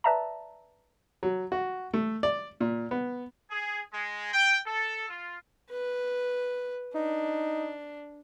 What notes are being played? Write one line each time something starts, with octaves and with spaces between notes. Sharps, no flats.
B4 D5 E5 A5 A#5
F#3
F#4
A3
D5
A#2
B3
G#4
G#3
G5
A4
F4
B4
D4 D#4